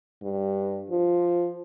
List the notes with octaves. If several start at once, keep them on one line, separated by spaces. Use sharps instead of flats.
G2
F3